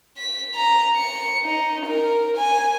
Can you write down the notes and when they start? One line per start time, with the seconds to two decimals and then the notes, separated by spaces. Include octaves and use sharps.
0.17 B6
0.55 A#5
0.96 C#7
1.44 D#4
1.86 A#4
2.37 G#5